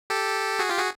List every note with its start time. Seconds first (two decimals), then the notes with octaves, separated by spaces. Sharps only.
0.10 G4 A4
0.59 F#4 G#4
0.69 F4 G4
0.79 F#4 G#4